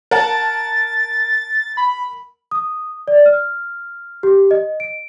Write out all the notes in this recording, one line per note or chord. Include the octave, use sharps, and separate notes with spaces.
A#4 F#5 A5 A6
B5
D#6
D5
F6
G4
D#5
D7